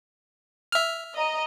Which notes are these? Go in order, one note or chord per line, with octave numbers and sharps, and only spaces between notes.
E5 F6
D#5 A#5